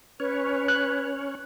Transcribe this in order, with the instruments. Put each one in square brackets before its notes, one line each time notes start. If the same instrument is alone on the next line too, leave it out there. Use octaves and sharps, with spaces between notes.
[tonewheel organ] C#4 C#5 [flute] B4
[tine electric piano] F#6